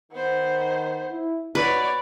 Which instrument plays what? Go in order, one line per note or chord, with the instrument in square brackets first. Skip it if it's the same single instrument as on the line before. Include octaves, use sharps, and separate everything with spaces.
[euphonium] D#3 [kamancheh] B3 C5
[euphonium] E4
[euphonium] B2 [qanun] B4 [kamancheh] C#5 D5